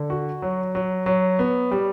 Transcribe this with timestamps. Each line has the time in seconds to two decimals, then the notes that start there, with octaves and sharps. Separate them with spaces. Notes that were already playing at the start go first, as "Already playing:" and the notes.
Already playing: D3
0.10 F#4
0.42 F#3
0.75 F#3
1.06 F#3
1.39 B3
1.71 G3